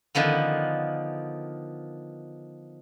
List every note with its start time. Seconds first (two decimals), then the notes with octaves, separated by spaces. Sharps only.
0.15 D3 D#3 F3 B3